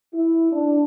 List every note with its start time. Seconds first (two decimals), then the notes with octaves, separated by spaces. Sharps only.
0.14 E4
0.52 D4